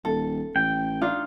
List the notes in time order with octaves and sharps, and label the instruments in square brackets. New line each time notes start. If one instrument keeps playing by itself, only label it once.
[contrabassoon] D#1 [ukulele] A4
[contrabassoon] A1 [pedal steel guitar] G5
[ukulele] D4 D#4 F4